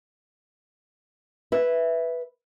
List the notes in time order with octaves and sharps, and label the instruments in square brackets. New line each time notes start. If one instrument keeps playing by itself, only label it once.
[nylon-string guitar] B4 E5